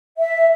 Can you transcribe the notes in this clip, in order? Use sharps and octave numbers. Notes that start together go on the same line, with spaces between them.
E5